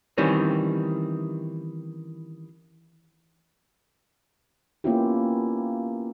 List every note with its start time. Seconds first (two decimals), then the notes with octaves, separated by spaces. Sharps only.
0.18 D#3 E3 G3 C4 C#4
4.84 A#3 B3 C#4 E4 F4 G4